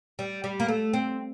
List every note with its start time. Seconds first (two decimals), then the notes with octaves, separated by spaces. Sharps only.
0.19 G3
0.44 G3
0.60 A#3
0.69 A3
0.93 C4